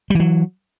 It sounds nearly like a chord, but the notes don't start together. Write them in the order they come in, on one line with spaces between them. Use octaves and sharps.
G3 E3 F#3